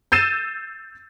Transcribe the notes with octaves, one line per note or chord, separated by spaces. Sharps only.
E6 G6 A6 C7 D#7 E7